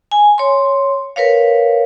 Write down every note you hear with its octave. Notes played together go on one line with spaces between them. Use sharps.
G#5
C#5 C6
A#4 B4 C#5 F5